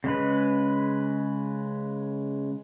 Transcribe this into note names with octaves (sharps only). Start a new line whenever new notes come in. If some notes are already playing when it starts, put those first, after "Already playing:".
C#3 G#3 B4